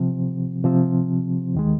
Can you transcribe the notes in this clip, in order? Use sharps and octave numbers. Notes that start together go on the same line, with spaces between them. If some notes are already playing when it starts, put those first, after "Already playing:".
Already playing: C3 F3 C4
C3 F3 C4
D#2 D#3 G#3